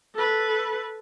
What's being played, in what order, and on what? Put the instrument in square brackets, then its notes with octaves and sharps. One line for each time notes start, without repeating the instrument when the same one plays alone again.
[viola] A4 B4